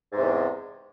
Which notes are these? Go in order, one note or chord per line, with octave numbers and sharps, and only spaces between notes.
E2 G#2 C3